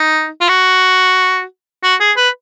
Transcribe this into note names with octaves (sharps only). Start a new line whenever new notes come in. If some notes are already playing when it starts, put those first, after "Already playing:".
Already playing: D#4
F4
F#4
F#4
G#4
B4